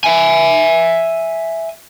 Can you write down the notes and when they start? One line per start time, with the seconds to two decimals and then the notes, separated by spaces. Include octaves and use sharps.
0.04 E5 G#5